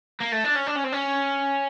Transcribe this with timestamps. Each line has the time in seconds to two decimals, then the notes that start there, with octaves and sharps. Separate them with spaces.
0.21 A#3
0.32 A3
0.45 D4
0.56 C#4
0.67 D4
0.76 C#4
0.85 C4
0.93 C#4